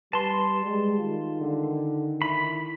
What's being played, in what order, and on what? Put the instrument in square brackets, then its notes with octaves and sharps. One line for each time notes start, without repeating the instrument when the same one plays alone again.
[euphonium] G3 [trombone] B4 [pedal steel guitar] A5 C6
[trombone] G3 [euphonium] G#3
[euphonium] D#3 [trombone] F4
[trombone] D3
[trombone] E4 [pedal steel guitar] B5